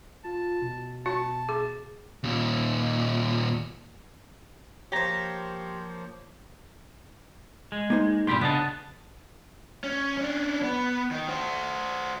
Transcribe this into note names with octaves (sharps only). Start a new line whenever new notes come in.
F4 A5
B2
F#4 A5
G#4
D#2 A#2
F3 A#3 G4 C5 C#5 A#5
G#3
A#3 D#4 C5
G2 A#2 E3 G4 B5 C6
C#3 B3 D4 D#5 A5
C#4
C#4 D4
B3
D#3
F#4 C5